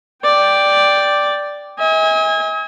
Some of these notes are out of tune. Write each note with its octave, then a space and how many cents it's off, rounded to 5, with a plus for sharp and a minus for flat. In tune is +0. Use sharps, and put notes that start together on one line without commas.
D5 +0 G5 +0
D#5 +45 G#5 -25